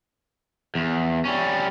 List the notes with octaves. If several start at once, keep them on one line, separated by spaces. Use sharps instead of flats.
E2
G3 C#4